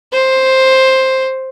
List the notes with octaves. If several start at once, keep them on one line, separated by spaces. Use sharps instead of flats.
C5